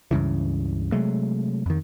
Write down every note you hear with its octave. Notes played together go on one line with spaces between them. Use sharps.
C#2 G2 C#3 E3
C3 F#3 G#3 A3
F2 D#3